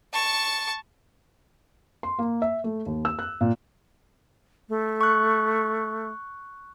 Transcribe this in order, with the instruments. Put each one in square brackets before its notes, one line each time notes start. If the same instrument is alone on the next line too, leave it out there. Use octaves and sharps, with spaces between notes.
[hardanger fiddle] A5 C#6
[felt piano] C6
A#3
E5
A3
D#2
E6
F#6
A#2
[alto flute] A3
[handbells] C#6 F#6